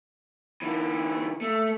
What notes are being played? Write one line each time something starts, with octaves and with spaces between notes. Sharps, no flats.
D3 E3
A3